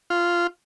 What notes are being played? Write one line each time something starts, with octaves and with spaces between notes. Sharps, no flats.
F4